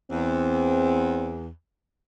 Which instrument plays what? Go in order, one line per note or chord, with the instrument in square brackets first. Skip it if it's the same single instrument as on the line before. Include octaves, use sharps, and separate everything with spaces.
[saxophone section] E2 [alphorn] C4